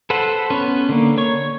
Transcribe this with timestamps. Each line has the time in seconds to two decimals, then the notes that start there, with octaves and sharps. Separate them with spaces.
0.10 A4 B4 C5 F#5
0.50 B3 C#4 B4
0.89 D3 A#3
1.18 C#5 C#6